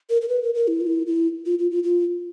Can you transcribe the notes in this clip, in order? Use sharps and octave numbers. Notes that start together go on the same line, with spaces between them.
A#4
A#4
B4
A#4
A#4
E4
F4
E4
E4
F4
F4
F4
F4